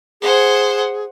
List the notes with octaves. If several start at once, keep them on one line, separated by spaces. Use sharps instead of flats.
G#4 C5 F#5